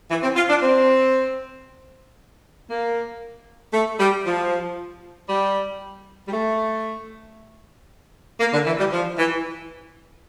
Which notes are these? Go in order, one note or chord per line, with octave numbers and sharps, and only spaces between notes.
E3
C4
F4
D4
C4
A#3
A3
G3
F3
G3
G3
A3
A#3
D3
E3
G3
F3
E3